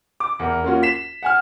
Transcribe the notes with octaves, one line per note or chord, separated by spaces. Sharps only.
D6
E2 A#4
A#3 C#4 F4 F#4
B6 C7 E7
F#5 G#5 F6